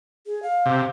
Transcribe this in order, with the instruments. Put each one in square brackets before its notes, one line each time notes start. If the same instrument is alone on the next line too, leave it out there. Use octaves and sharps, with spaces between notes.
[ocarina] G#4
F5
[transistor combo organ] C3